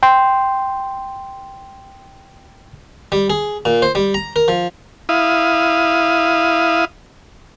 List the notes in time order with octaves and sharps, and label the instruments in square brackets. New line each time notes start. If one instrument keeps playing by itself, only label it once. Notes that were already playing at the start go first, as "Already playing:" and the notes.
[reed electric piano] G5 C6
[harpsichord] G3
G#4
A#2
C5
G3
A#5
A#4
F3
[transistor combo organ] E4 F5 D#6